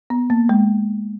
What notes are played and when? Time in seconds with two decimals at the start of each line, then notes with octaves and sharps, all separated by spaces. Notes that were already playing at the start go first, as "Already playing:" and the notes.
0.10 B3
0.30 A#3
0.49 G#3